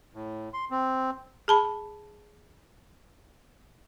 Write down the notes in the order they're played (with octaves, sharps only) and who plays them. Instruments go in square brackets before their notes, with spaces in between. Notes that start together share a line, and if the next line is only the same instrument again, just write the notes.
[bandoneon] A2
C6
C4
[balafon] G#4 A5 B5